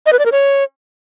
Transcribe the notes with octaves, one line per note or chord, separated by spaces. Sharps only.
D#5
B4
D5
A#4
C#5